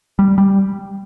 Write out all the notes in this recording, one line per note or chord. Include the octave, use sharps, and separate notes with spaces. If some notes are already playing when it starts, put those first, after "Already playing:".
G3
G3